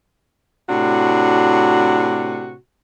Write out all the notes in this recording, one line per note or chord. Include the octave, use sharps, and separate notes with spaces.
A2 C3 D4 F#4